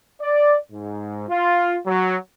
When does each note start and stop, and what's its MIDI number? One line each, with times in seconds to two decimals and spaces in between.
0.22 0.57 74
0.72 1.25 44
1.28 1.77 65
1.87 2.17 54